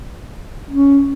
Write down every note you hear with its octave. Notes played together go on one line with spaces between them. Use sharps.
C#4